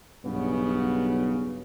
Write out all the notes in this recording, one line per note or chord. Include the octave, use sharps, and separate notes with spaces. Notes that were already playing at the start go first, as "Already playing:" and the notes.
B1 G2 C#3 B3